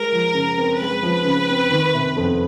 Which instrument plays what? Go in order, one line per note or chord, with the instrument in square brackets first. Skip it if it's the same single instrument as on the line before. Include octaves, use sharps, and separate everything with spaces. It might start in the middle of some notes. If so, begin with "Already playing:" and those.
Already playing: [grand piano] G#3 [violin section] A#4
[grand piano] F3
C#3
C4
[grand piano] G#3 [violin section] B4
[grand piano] F3
C#3
C4
D#3
C3
F2